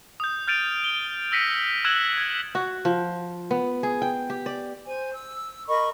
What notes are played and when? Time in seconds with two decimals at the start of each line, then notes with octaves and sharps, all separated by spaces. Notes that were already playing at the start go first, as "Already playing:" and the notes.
0.20 D#6 G6
0.47 F6 G6 A6 D7 D#7 F7
0.84 G7
1.32 E6 A#6 B6 C#7 D#7
1.85 E6 F#6 G#6 E7 F#7
2.13 F#6 G#6
2.55 F#4
2.85 F3
3.51 B3
3.83 G#4
4.02 G5
4.30 G4
4.46 D5
4.87 C5 G#5
5.13 E6
5.68 A#4 D#5 B5 C#6